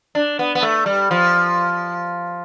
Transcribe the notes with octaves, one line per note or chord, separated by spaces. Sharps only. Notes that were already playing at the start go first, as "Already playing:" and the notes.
D4
B3
B3
A3
G3
F3